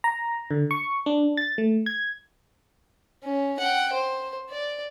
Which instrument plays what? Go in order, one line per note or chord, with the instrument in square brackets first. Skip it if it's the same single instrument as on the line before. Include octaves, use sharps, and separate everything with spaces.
[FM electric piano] A#5
D3
C#6
D4
A6
A3
G#6
[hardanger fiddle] C#4
F#5 G5
C5
D5